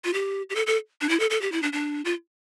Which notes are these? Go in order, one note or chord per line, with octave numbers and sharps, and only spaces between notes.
F4
G4
G4
A4
A4
D4
E4
A4
A4
G4
E4
D4
D4
F4